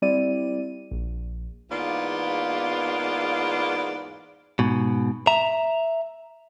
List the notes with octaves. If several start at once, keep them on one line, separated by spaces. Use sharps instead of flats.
G3 C4 E4 D5 D#7
A#1
E2 G#2 A#3 B3 F4 D5
G#2 B2
E5 A#5